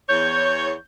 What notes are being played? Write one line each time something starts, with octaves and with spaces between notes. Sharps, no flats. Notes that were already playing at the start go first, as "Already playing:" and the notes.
E2 C#5 G6